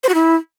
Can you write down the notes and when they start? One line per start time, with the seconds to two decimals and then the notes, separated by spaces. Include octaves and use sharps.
0.03 C5
0.09 F#4
0.14 E4